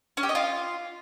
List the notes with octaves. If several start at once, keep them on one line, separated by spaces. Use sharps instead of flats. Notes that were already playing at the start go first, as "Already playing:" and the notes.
C#4
G4
D#5
F4